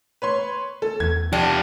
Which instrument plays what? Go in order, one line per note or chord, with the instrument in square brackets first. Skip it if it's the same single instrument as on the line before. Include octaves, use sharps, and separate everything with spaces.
[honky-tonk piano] B4 C#5 C6
A4
[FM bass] E2 [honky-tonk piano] G#6
[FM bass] F3 [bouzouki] D4 [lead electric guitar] F4 G4